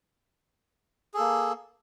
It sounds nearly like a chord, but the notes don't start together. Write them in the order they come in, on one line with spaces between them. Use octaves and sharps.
G#4 A4 A#3